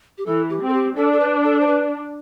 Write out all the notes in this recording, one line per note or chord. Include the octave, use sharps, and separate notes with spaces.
G4
E3 A4
G4
C4
A4
G4
D4 A4
A4
B4
A4
C5
B4